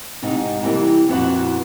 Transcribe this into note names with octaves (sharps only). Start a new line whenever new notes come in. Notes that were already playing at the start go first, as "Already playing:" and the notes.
G#2 C3 D#4
C3 E3 G3 A#3 E4 G4
F2 A#2 B3 C#4 E4 F#4